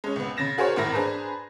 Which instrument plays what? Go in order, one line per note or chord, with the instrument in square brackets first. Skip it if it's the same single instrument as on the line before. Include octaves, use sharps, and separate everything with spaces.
[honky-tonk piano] G#3 C#4
C#2 B3
C#3 A6 A#6 E7
F#4 G#4 A#4 C5 C#5
G#1 E2 A2 A#4 E5 A#6
D4 G#4 B4 C5 A#5